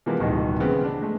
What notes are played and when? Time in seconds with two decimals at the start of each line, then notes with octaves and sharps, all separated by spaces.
0.06 C3 E3 F3 G#3 A#3 B3
0.20 D1 B2 D#3 G3 D#4
0.60 C#3 E3 B3 C4
0.84 D4
1.01 G#3 A3